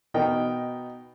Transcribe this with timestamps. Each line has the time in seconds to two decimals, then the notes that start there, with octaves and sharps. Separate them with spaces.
0.14 B2 D#4 A#4 G5